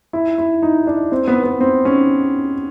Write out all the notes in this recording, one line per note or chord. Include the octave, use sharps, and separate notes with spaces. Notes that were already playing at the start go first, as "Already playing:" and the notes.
E4
E4
D#4
D4
C4
B3
B3
C4
C#4